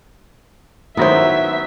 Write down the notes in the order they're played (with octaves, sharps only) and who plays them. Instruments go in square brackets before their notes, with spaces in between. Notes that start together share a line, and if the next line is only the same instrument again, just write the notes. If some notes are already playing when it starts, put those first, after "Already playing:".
[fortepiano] D#3 F#3 E4 [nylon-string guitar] B3 C5 [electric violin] E5